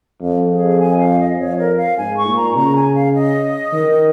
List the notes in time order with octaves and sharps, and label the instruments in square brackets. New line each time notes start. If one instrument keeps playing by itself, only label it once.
[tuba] F2
[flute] G#4
G#5
F5
D#5
[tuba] F2 [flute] C#5
[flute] A#4
F5
[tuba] G#2 [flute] G#5
[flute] C#6
[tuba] A#2
[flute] A#5
[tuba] C#3 [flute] A#5
[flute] G#5
F5
D#5
[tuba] D#3